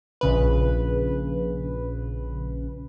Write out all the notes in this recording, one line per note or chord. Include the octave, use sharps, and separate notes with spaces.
A#1 C#3 B4